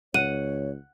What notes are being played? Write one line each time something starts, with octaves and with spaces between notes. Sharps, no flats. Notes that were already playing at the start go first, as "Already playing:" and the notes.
C#2 C#5 F#5 D#7